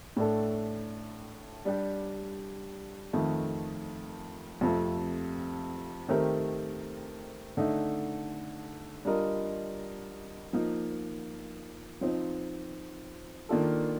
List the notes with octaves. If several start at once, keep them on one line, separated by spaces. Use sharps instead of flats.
A2 A3 D4 A4
G3 D4 G4
F2 D#3 A3
F2 C3 F3 A3
D#3 A3 C4 G4 A#4
D3 A3 D#4
G3 D4 F4 A#4 D#5
F3 A#3 D#4
F3 C4 D#4
D#3 A#3 D4 F4 A4